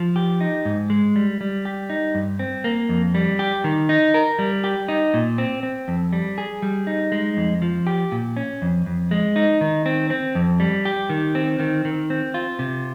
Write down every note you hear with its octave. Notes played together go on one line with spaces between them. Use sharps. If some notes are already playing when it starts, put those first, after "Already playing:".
Already playing: F3
G4
D#4
G#2
G#3
G3
G3
G4
D#4
G2
C4
A#3
F2
G3
G4
D#3
D#4
A#4
G3
G4
D#4
A#2
C4
C4
F2
G3
G#4
G3
D#4
G#3
F2
F3
G4
A#2
C#4
F2
F2
G#3
D#4
D#3
C4
C4
F2
G3
G4
D#3
C4
D#3
D#3
C4
F4
C3